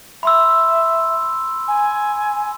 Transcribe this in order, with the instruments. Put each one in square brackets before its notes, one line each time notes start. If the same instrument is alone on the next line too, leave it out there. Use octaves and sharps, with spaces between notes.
[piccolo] E5 [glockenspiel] B5 C6 E6
[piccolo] G#5